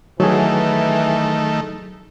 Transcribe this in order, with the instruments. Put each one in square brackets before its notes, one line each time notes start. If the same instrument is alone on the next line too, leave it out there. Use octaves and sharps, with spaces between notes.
[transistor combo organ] D#3 A3 [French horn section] E3 [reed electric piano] F#3 G#4